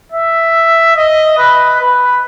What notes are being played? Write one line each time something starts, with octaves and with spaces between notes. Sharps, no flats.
E5
D#5
B4
B4